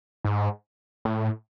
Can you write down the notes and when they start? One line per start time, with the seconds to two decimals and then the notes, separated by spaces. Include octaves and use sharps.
0.25 G#2
1.05 A2